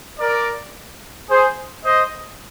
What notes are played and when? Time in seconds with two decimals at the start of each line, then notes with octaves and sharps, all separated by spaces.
0.19 A#4 D5
1.29 G#4 C5
1.84 C5 D#5